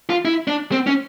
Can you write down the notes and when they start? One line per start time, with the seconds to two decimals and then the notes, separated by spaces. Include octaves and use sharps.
0.10 F4
0.25 E4
0.48 D4
0.72 C4
0.87 C#4